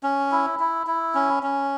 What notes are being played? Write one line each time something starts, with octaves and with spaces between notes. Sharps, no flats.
C#4
E4
E4
E4
C#4
C#4